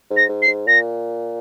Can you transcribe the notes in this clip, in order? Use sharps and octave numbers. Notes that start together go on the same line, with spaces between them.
G#2
A#6
G#2
C7
G#2
A#2 A#6